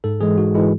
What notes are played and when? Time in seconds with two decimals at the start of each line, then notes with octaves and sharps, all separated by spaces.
0.04 G#2 A4
0.21 E3 G#3 G#4
0.38 G#2 F#4
0.55 E3 G#3 E4